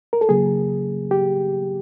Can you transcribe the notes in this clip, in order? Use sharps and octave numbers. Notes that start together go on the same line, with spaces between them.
A#4
A4
C#3 F#3 A#3 G#4
G4